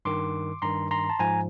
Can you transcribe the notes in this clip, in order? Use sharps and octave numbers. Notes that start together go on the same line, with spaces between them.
G2 D#3 C6 D6
G2 D#3 A#5 C6
A#5 C6
A5
G#2 F3 G#5 A#5